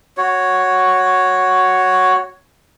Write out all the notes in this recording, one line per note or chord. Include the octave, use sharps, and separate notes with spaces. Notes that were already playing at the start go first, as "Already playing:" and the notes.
F#4 C#5